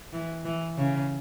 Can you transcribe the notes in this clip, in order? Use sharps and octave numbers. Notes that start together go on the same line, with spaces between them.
E3
E3
C#3